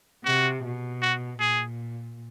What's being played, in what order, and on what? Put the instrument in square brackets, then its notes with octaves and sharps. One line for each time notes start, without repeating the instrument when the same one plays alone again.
[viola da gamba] C3 [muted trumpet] F#4
[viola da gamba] B2
[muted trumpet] F#4
[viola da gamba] A#2 [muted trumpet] G#4